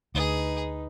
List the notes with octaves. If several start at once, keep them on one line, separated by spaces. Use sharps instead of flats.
D2 D#4 G#4 B4